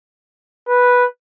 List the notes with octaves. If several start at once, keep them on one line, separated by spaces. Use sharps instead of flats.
B4